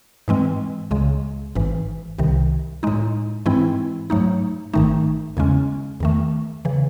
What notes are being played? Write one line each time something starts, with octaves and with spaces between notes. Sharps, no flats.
G#2 E3 G#3 C4
C#2 C#3 G#3
G#1 G#2 E3
C2 C3 D#3
A2 G#3 D#4
G#2 E3 G#3 C4 E4
G#2 F#3 A3 D#4
G#1 G#2 D#3 A3 D#4
E2 C#3 G#3 C#4
E2 D#3 A3
C#3 E3